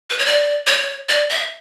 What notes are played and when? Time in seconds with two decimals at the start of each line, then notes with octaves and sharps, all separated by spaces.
0.10 B4
0.18 C#5
0.26 D5
0.67 C#5
1.09 D5
1.30 E5